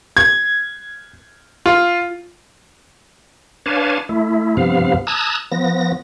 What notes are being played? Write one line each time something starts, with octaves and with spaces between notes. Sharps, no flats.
G#6
F4
D4 B4 C#5 F5 G#5 A5
A3 E4
G2 C3 F3 B3 F5
A5 A#5 D#6 E6 F#6 G#6
F3 B3 A#6